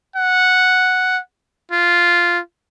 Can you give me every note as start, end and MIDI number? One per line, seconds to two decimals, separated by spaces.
0.16 1.20 78
1.71 2.40 65